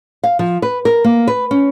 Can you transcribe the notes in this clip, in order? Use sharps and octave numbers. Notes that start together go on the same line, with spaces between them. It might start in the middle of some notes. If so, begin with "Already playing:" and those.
F5
F3
B4
A#4
A#3
B4
C#4